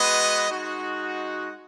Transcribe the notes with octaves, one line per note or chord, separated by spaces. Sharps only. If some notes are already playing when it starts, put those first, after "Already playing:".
Already playing: G#3 B3 F#4 B4 D#5
G#3 D#4 F#4
D#5 F#5